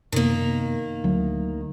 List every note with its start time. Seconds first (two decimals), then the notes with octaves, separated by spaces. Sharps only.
0.12 F#2 C3 D#3 A#3 B3
1.04 D2 F#3